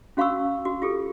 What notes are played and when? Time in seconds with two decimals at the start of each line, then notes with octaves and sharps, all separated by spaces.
0.17 C#4 F#4 F5 B5 C#6 E6
0.65 F#4
0.82 F4 G4 A4